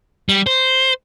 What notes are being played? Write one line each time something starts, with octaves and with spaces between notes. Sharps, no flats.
G3
C5